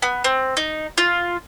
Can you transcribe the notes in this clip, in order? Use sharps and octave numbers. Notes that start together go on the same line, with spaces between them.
B3
C4
D#4
F4